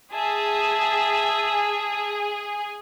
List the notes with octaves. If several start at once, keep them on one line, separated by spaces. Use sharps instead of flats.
G#4 E5 A5